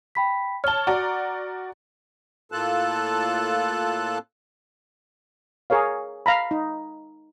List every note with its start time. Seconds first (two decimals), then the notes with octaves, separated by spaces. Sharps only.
0.15 G5 B5 B6
0.64 C#5 A5 F6 G7
0.87 F#4 D5 A#5
2.52 A2 A#3 F4 A4 A5 F#6
5.70 G#4 A#4 C#5 F5
6.26 F5 A#5 B5
6.51 D#4